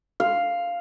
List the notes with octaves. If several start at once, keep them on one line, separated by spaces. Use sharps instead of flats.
F5